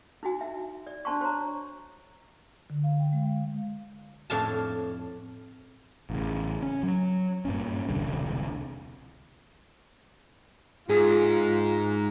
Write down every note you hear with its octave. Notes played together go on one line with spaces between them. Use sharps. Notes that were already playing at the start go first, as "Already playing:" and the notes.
D#4 E4 F#4 G#5
E5
D5
D4 C5 A5 C6 C#6
C5 C#5 A#5
D3
F5
G5
G#3
F5
F2 A2 D4 C#5 F5 A5
A1 C#3
C#4
F#3
G2 A#2 C#4
E1 C2 D3 G3
G#2 F4 G#4